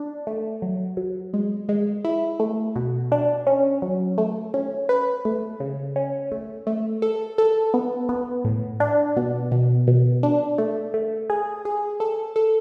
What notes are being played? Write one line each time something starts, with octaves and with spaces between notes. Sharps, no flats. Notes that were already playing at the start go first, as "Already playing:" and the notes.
Already playing: D4
A3
F#3
F#3
G#3
G#3
E4
A3
B2
D4
C#4
F#3
A3
C#4
B4
A3
C#3
C#4
A3
A3
A4
A4
B3
B3
A2
D4
B2
B2
B2
D4
A3
A3
G#4
G#4
A4
A4